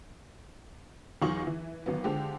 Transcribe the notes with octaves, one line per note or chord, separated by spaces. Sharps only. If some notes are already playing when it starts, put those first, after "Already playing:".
E2 F#3 D#4 F4 C#6 F#7
E3
G#1 F#3 B3
D3 F3 G#3 G4